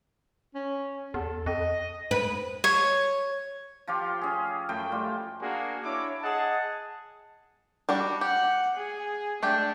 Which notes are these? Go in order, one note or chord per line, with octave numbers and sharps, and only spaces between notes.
C#4
E2 A4
F2 D#5
B4
C#5
F3 F4 G4
C#4 G#4
F#2 A3 G5
G3 F4
A#3 D4 F#4 G#4 A#4
D4 E4 C#5 D6
G#4 D#5 F#5 A5
G3 D4 F#4
G4 F#5
G#4
A3 D4 G4 G5